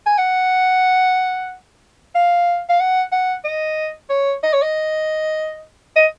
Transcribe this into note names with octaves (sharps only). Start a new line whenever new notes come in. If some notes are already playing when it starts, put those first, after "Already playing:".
G#5
F#5
F5
F5
F#5
F#5
D#5
C#5
D#5
C#5
D#5
D#5